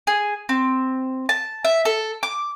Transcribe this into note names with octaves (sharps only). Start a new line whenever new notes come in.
G#4
C4
A5
E5
A4
D6